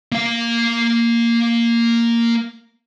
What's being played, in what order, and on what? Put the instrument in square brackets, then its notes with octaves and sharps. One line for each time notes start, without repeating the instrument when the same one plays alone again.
[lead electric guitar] A#3 F5